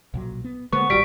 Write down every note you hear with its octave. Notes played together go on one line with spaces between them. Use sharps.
B1 A#2 F#3
B3
D3 G#3 A#3 B3 C#6
D1 G#1 G3 F#4 B6 D7